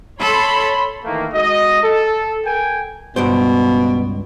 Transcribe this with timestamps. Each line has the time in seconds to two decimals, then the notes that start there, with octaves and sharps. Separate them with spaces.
0.20 A4 C#5 B5 C6
1.04 D#3 E3 A3 A#3
1.33 G#3 F#4 D#5
1.82 A4
2.45 A4 A#4 G5 G#5
3.16 C#2 G2 B2 C5